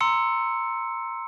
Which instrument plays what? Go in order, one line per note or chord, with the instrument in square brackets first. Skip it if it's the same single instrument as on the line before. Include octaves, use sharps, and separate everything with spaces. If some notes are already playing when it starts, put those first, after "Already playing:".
[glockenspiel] A#5 C6 E6 C#7